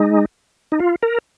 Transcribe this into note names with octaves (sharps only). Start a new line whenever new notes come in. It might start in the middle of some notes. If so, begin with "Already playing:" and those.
Already playing: G#3 D#4
D#4
F4
A#4